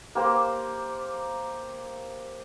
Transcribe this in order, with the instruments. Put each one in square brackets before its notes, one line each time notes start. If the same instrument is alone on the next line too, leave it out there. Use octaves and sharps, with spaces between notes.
[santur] A#3 G4 C5